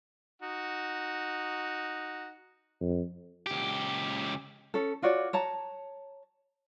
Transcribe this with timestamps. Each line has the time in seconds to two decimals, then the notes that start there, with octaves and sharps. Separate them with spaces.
0.42 D#4 F#4
2.81 F2
3.46 C#2 G4
4.74 C#4 A4
5.02 F4 F#4 C#5 D5
5.33 C#5 A5 A#5